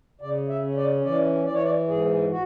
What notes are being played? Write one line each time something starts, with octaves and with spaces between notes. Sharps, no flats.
C#3 D5
E5
C#4
D5
E3 D5
E3 D5
C#5
D5
G#2 G#4
F#4